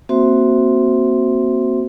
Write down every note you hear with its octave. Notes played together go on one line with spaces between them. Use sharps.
A#3 C4 F#4 C5 E5 C6